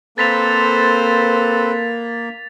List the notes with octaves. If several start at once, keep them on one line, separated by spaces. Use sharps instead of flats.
A#3 C4 A4 B4 C5 A6 B6 F7